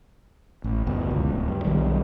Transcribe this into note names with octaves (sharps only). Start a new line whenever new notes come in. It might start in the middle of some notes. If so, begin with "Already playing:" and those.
A1
F#1 D2 B2
C#2
D1
G2
B1 D#3 G3